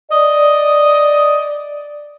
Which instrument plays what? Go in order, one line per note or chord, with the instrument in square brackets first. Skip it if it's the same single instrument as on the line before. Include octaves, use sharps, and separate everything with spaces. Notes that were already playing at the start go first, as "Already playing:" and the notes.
[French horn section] D5 [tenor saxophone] D#5